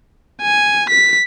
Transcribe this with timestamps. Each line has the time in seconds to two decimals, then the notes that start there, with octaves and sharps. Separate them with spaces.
0.42 G#5
0.90 B6